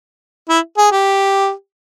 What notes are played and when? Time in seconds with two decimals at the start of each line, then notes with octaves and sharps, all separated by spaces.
0.49 E4
0.78 G#4
0.92 G4